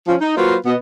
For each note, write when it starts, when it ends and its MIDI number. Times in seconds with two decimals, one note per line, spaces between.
0.08 0.16 53
0.08 0.16 61
0.21 0.36 63
0.37 0.56 54
0.37 0.56 58
0.37 0.56 65
0.37 0.56 66
0.37 0.56 71
0.37 0.56 72
0.66 0.75 47
0.66 0.75 59
0.66 0.75 75